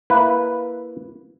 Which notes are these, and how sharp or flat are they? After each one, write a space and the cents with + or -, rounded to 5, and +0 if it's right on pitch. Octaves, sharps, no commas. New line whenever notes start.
A#3 +0 E4 +5 B4 +0